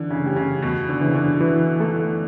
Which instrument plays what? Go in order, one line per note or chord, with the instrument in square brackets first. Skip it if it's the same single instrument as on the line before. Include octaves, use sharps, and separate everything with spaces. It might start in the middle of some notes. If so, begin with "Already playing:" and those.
Already playing: [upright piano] D3 [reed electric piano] E3
[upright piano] C#3
[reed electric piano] A3 C#4 G4
[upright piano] C#3
[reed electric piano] E2 [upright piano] B2
[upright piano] D3
[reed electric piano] C#3 E3
[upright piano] D3
[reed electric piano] E3
A3 E4 A4